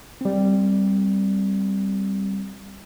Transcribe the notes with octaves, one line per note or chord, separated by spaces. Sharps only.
G3 C4